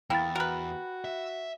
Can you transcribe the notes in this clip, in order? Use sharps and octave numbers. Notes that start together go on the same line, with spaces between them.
E2 A#3 E4 G5 B5 A6
F#4 A#4 B4
E5